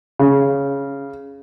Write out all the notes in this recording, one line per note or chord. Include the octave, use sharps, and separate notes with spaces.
C#3